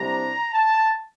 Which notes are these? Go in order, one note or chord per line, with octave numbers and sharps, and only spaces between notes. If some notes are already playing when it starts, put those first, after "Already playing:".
Already playing: C2 C3 G3 D4 A#5
A5